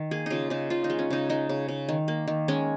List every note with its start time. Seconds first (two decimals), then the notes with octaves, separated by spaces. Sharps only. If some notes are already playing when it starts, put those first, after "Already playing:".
Already playing: D#3
0.11 A#3 G#4
0.26 C#3 D#4 F4
0.50 C#3 D#4
0.70 C#3 F4
0.84 D#4
0.90 G#3
0.99 C#4
1.10 C#3 D#4
1.29 G#3 D#4
1.49 C#3
1.68 C#3
1.89 D#3
2.08 A#3
2.28 D#3
2.48 G#3 C#4